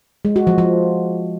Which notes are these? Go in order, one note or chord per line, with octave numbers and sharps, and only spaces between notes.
G#3
F#4
F3
F3